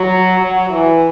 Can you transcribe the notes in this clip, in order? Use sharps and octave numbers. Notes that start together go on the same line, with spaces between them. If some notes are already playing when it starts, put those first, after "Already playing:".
Already playing: F#3
F#3
E3